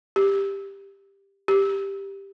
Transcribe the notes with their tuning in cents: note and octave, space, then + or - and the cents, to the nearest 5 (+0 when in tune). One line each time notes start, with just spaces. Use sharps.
G4 +10
G4 +5